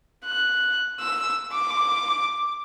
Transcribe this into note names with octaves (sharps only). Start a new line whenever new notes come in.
F#6
E6
D6